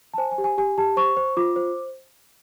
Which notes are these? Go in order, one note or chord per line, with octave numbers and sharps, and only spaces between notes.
A5
C5 G#5
G#5
G4
G#5
G4 G#5
G4 A5
C5 C#6
C5
F4 D6
C5